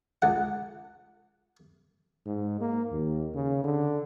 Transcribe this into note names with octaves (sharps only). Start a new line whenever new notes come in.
C#2 F#5
G#2
A#3
D#2
C#3
D3